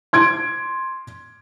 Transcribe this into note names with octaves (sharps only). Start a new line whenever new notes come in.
C6 G#6 D7